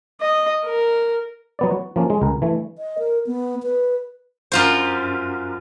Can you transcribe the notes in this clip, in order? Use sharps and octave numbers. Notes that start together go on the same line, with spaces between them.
D#5
A#4
F#3 B3 D5
F#4
F3 A#3 C#4
G#3
C#2 A#4
E3 A3
D#5
A#4
B3
B4
F#2 F4 C5